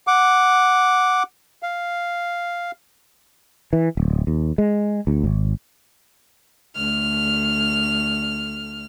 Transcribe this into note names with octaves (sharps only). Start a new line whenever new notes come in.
F#5 D6
F5
E3
D1
D#2
G#3
D2
G#1
D2 F6